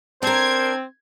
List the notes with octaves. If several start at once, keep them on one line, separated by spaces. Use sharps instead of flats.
C4 D4 A#4 C5 G#6